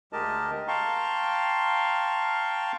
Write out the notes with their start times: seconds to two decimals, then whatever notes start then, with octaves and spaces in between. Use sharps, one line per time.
0.13 D2 G#3 G4 A#4 D#5 A5
0.68 F5 G5 A5 A#5 C6 C#6